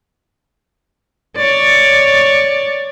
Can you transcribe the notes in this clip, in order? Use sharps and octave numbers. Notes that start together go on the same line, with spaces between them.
C#5 D5